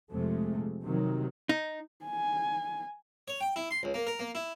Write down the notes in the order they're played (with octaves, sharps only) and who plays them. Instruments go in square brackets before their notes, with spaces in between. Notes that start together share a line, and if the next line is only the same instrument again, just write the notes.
[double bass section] F2 C3 G#3 A3
C3 D#3 F#3
[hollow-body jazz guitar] D#4
[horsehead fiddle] G#5
[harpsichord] C#5
G5
E4
C6
C#2
A#3
A#4
A#3
E4